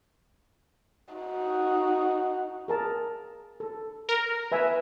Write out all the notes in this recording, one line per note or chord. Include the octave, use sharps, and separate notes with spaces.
D#4 F#4
G#4 A#4 A5
A4
A#4
B4 E5 G#5